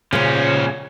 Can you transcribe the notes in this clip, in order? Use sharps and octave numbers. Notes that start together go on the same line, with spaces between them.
A#2 C#3 F3 C#4